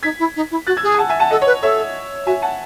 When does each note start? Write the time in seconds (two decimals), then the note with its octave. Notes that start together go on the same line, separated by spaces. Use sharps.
0.03 D#4 G#6 B6
0.19 E4
0.36 D#4
0.51 E4
0.67 F#4 F#6 A6
0.77 E6 G#6
0.83 G#4
0.94 G#5
0.98 F#5 A5
1.09 E5 G#5
1.19 F#5 A5
1.30 A4 D#5 F#5
1.42 B4 C#5
1.62 A4 C#5 E5
2.26 F#4 E5 G#5
2.42 F#5 A5